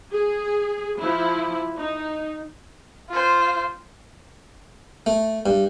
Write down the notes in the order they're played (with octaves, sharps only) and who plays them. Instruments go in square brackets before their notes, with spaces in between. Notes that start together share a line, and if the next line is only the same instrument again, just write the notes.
[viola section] G#4
F3 E4
D#4
[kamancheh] F4 C5
[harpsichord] A3
G2